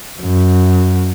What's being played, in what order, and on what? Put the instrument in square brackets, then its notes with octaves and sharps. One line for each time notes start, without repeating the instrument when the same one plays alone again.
[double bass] F#2